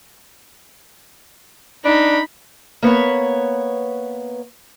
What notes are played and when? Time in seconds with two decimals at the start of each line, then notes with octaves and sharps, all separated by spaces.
1.85 D4 D#4 B5
2.83 A#3 B3 B4 C#5